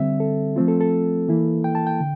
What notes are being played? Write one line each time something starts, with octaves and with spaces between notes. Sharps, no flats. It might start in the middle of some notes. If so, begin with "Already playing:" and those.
Already playing: D3 G3 C4 E5
A4
F3 A3 C4 F4
A4
A4
E3 A#3 E4
G5
A5
G5
D3